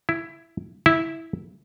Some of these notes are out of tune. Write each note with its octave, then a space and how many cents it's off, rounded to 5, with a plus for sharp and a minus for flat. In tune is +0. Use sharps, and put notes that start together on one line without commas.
E4 +10
E4 -10